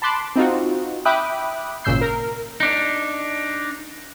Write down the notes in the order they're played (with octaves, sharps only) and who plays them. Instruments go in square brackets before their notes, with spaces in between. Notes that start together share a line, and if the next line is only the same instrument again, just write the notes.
[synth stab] A5 B5 C6 D6 F#6
C4 D#4 F4 F#4
E5 G5 B5 D6 D#6 F#6
G#1 A#2 C#3 E6 G6 C7
A#4
[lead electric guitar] D4 D#4